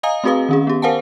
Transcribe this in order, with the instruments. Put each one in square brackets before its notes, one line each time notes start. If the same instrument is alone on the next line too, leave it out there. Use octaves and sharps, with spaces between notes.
[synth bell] D#5 F5 G#5 A#5 D#6
A3 C4 F#4 G#4 B4 F5
D#3 C#4 G#4
B3 G4
A#4 C5 F5 F#5 G#5 A5